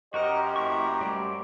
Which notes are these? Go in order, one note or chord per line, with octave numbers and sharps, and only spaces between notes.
F#2 F#4 G4 A#4 C5 D#5 F#5
A#3 E4 A#5 C#6
G3 A3 D5